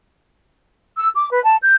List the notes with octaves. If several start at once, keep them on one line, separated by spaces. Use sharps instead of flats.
E6
D6
B4
A5
G6